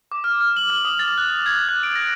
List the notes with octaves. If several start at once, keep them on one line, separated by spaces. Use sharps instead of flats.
D6
F6
F6
F#7
F6
D#6
A6
F#6
G#6
F#6
D7
A#6